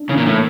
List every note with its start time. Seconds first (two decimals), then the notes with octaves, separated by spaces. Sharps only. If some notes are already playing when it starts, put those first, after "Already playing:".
Already playing: D4
0.09 C#3 E3
0.17 A#2
0.26 A2 A#3